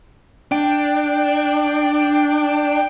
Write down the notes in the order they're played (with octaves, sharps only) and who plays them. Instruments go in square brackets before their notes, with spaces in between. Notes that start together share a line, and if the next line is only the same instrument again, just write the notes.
[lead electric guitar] D4 [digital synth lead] G5